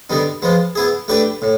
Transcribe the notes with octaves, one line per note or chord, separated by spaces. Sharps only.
D3 G3 B3 D#4
F3 G#3 B3
B3 E4 G#4
A3 D4 G4 B4
A2